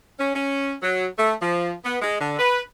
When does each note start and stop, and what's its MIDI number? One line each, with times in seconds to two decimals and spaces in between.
0.19 0.32 61
0.35 0.73 61
0.82 1.07 54
1.19 1.34 57
1.42 1.73 53
1.84 1.96 59
2.02 2.18 56
2.20 2.35 50
2.39 2.61 71